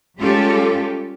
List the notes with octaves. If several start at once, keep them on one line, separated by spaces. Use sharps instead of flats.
G3 G#3 C#4 F4 G4 A4